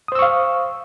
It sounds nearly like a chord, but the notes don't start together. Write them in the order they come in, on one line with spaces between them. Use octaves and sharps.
D#6 C5 E6 C#6 F5